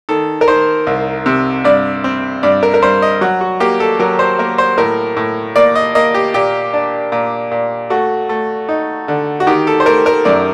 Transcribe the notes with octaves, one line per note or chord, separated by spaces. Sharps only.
D#3 A4
A#4
D#3 C5
C2
C3
G2 D5
C4
G2 D5
A#4
A#4
G2 C5
D#5
F#3 F#4
F#4
A#3 G4
A4
F#3 A#4
C5
A#3 A#4
C5
A2 A#4
A2
A#3 D5
D#5
A#3 D#5
G4
A#2 G4
D4
A#2
A#2
A3 F#4
A3
D#4
D3
F#4
D#3 G4
A4
C5
A3 A#4
A#4
F#2 D5